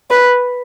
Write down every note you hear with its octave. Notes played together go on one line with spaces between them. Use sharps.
B4